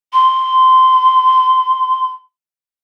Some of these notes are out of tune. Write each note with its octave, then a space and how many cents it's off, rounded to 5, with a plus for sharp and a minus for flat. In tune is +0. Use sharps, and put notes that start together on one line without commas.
C6 -15